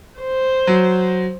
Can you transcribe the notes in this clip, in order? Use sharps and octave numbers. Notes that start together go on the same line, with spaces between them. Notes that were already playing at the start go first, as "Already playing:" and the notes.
C5
F#3